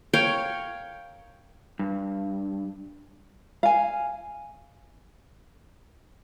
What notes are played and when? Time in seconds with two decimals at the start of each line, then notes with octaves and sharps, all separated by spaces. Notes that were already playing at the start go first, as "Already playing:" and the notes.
0.13 A#4 C#5 F5 G5
1.79 G2
3.63 F5 G#5